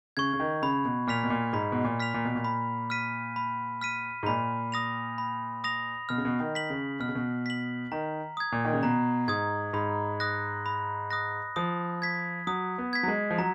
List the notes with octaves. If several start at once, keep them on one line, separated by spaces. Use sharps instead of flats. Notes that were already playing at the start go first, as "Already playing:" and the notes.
C#3 C#6 G#6
C#3
D#3
C#3 B5
B2
A#2 F6 B6 F7
B2
A#2
G#2 B5
B2
A#2
F6 B6 F7
A#2
B2
A#2
B5
F6 B6 D#7
B5
F6 B6 D#7
G#2
A#2 B5
D#6 A#6 F7
B5
D#6 A#6 F7
B2 F6
C#3
B2
D#3
B6 F#7
C#3
B2 F6
C#3
B2
B6 F#7
D#3 A#5
D#6 G#6
A#2
D#3
C#3
B2 A#5
G#2 D#6 G#6
G#2 B5
D#6 F#6 A#6
B5
D#6 F#6 A#6
F3 D#6
G#6 B6
F#3 D#6
B3
G#6 B6
F#3
G#3
F3
F#3 A#5